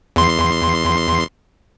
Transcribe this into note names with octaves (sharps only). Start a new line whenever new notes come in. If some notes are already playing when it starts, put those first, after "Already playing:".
E2 C6